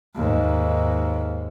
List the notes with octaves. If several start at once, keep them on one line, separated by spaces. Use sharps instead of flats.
D#2 G#2